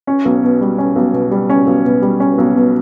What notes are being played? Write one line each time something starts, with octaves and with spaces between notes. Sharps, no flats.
C#4
B1
B2
G3
C#4
B1
B2
G3
C#4
B1
B2
G3
C#4
B1
B2